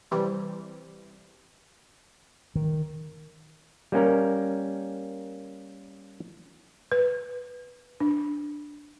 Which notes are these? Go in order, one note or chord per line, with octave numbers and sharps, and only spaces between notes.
C3 E3 G3
D#3
G3 A#3 C#4 A#4
B4
D4